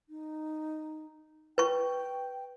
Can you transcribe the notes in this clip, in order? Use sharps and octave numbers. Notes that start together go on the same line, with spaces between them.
D#4
B4 G5 C#6